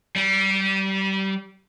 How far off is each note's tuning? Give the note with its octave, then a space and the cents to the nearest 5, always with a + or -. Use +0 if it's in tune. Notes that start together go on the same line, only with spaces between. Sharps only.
G3 -25